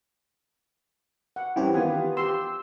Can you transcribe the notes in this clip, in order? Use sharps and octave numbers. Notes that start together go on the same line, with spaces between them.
F#5
G2 E3 C4 C#4 G4
D#3 B3 F4 G#5
G4 C6 E6